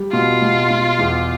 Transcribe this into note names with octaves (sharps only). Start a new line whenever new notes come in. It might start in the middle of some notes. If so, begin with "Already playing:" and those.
Already playing: G3
B2 F4
B2
B2
E2